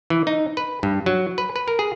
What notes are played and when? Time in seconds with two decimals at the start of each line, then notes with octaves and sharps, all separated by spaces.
0.10 E3
0.27 D#4
0.57 B4
0.83 G2
1.06 F#3
1.38 B4
1.56 B4
1.68 A#4
1.79 G#4